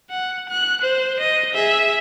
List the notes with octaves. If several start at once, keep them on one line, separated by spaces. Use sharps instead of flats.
F#5
F#6
C5
D#5
G#4 E5